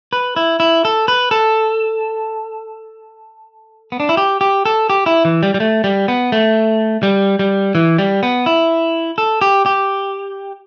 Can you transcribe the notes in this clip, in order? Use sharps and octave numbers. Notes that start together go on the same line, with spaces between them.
B4
E4
E4
A4
B4
A4
B3
D4
E4
G4
G4
A4
G4
E4
E3
G3
G3
A3
G3
B3
A3
G3
G3
E3
G3
B3
E4
A4
G4
G4